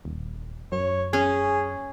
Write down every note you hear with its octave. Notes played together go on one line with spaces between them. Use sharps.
D#1
F#2 C#5
C#4 G#4